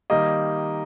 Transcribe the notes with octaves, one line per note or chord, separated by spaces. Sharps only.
D#3 G3 A#3 D#5